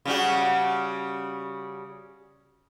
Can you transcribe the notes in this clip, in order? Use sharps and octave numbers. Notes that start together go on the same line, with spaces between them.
C#3 G3 F#4